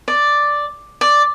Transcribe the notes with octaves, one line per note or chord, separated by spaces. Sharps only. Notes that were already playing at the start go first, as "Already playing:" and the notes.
D5
D5